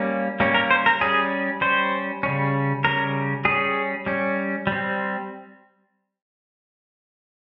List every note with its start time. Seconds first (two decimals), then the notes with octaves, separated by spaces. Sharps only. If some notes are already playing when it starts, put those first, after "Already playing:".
Already playing: G3 A#3 C#4
0.40 G3 A#3 C#4
0.54 A#4
0.71 C5
0.86 A#4
1.01 G3 C#4 G#4
1.61 G3 C#4 C5
2.23 C#3 G3 C#4
2.84 C#3 G3 C#4 A#4
3.45 G3 C#4 G#4
4.06 G3 C#4
4.67 G3
4.72 C4